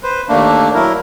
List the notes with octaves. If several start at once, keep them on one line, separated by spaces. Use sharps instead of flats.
B4 C5
D#2 A3 A#3 D4
F#3 E4 A#4